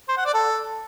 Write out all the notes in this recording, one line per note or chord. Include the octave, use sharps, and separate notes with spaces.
C5
F#5
D5
A4